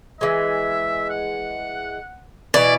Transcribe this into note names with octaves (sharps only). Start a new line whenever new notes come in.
E3 G#3 E5
F#5
B2 E3 D5